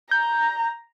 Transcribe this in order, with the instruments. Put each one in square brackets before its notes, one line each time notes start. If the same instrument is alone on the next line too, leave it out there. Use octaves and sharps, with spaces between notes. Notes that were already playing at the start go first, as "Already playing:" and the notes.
[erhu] A#5 [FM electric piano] G6